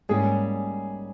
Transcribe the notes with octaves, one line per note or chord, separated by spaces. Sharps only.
G#2 G3 A#3 C#4 G4 G#4